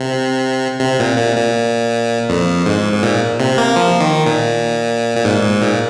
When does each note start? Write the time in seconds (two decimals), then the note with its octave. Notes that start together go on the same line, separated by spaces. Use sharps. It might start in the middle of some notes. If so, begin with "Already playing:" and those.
Already playing: C3
0.80 C3
0.99 A#2
1.18 A#2
1.36 A#2
2.29 F2
2.66 G#2
2.93 G#2
3.03 A#2
3.40 C3
3.58 A#3
3.76 F3
4.00 D#3
4.26 A#2
5.17 A#2
5.24 G#2
5.43 G#2
5.61 A#2